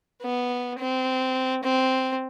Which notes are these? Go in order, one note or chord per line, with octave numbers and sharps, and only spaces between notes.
B3
C4
C4